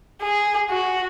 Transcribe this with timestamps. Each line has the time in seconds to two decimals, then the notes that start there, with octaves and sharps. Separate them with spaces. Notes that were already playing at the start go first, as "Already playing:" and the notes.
0.22 G#4
0.71 F#4